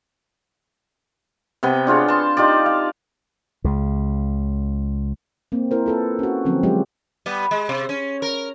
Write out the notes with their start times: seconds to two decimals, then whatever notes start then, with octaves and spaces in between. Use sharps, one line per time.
1.63 C3 B3 G5
1.87 D4 F4 G#4 C#5
2.08 A5 C6
2.37 D#4 F4 G4 D5
2.66 F5
3.64 C#2 C#3
5.52 A#3 C4
5.71 E4 A#4 C5
5.86 F4 A4 B4
6.19 C#4 F#4
6.45 D3 F3 F#3 A#3 C4 C#4
6.63 F#3 G#3 F4 G4
7.26 G3 B3
7.51 G#3
7.69 C3
7.89 C#4
8.22 A#4